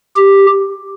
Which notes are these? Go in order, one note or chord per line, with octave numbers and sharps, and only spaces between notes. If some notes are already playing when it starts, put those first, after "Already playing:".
G4